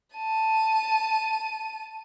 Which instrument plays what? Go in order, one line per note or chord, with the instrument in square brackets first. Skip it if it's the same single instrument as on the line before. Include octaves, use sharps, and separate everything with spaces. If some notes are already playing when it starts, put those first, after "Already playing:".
[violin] A5 D#7